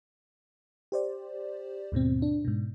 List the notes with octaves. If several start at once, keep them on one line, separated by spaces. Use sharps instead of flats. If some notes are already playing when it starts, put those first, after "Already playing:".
G4 C5 D5
D#2 G#2 B2 C4
D4
G#2 B2